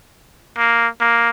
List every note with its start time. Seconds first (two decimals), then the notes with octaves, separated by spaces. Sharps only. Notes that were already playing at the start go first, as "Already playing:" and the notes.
0.58 A#3
1.01 A#3